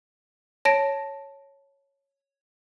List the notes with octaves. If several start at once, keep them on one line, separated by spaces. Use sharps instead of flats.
C#5 A5 A#6 D7